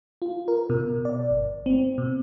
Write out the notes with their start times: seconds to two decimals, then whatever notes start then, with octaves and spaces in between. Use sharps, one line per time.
0.22 F4
0.48 A#4
0.70 B2
1.05 D5
1.31 G1
1.66 C4
1.98 B2